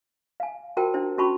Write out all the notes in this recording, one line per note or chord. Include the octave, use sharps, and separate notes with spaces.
F5 G#5
F4 F#4 A#4 C5 G5 A5
D4 E4 C5
C#4 F4 F#4 A5 B5 C#6